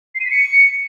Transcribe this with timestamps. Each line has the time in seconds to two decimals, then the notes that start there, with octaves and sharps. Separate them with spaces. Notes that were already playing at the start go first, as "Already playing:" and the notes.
0.15 C7
0.20 D#7
0.25 B6
0.31 C#7